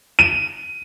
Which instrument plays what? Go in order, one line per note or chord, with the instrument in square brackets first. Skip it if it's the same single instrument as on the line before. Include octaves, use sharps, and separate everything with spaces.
[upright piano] D#7